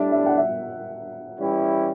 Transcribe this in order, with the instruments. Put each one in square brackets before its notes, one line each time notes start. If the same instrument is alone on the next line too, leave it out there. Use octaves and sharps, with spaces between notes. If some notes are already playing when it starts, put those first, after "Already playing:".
Already playing: [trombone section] A2 G3 D4 [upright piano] E5
[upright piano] E5
F#5
E5
[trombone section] E3 G3 C#4 E4 G4